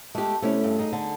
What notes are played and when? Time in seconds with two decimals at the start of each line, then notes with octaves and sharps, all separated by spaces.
0.15 G#3 A3 G4
0.42 C3 A3 C#4 E4
0.64 G2
0.79 D#4 G#4
0.93 D3